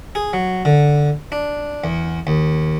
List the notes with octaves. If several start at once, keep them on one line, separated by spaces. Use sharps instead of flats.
G#4
F#3
D3
D4
E2
D#2